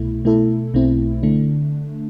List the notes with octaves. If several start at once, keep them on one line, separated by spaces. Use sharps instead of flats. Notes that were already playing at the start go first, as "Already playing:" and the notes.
Already playing: C2 B2 A3 E4
B2 A3 E4 A4
B1 B2 A3 C4 E4
D3 A3 D4